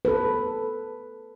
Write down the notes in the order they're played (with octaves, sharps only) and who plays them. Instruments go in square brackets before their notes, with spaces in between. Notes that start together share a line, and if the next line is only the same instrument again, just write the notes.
[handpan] A4 B4